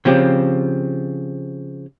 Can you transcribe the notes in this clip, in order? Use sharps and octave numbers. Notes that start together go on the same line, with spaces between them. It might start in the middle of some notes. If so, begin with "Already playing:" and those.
C#3 F3 C4 G4